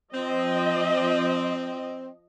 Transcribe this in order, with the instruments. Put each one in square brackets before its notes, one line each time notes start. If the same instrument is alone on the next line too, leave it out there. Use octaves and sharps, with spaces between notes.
[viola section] F3 D#5 [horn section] C4